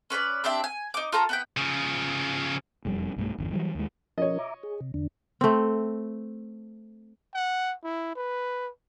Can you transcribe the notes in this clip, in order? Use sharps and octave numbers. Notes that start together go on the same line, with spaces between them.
C#4 B4 C#5 D5
C4 D4 G4 E5
G#5
D#4 D6
F4 A4 A#5 C#6
B3 E4 G5
C#3 F3
E1 F2 G3
B1 G2 A3
G1 E2
E3 F#3 G3
D#2 G#3
F3 C#4 A#4 C#5 D#5
E5 A#5 D6
G#4
C3
E2 D3 D4
A3 C4
F#5
E4
B4